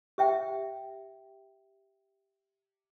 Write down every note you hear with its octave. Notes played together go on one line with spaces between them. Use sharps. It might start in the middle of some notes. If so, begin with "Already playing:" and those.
G4 E5 G5